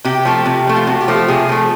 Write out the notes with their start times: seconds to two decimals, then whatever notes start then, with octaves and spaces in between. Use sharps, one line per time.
0.04 C3 G4
0.25 F3 A3
0.46 C3
0.67 F3 A3
0.76 F4
0.87 C3 F#4
1.01 G4
1.08 F3 A3
1.14 G4
1.28 C3 G#4
1.49 F3 A3